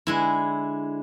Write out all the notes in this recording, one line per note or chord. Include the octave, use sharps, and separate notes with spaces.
D3 G#3 E4